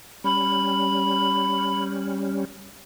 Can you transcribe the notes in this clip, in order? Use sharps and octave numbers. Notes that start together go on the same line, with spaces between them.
G3 C#4 B5